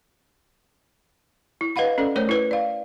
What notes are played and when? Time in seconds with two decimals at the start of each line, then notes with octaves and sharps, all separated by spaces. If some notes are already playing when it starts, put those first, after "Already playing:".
1.61 E4
1.76 B4 D#5 F5 F#5 B5
1.98 C#4 A4 D5
2.16 A3 A#4 C5 C#5
2.29 E4 B4
2.51 D5 F5